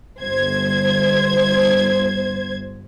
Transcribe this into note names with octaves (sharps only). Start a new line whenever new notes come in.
G1 C5 G#6